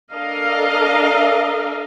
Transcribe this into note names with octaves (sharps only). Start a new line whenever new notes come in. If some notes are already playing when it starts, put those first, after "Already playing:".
D4 A4 A#4 D#5 F5